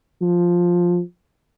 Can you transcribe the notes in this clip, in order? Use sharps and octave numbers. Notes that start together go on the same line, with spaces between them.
F3